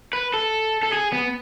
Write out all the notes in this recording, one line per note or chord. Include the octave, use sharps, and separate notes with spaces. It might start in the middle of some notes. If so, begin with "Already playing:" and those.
B4
A4
A4
G#4
B3